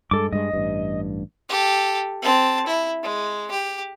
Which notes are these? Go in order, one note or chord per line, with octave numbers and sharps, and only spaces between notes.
G2 G#3 A4 D6
G2 G#3 D#5
A1 G2
G4 A4
C4 A5
E4
G#3
G4